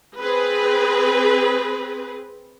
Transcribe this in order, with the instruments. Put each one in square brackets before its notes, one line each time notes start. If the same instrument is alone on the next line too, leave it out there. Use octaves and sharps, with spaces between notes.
[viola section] C4 G#4 B4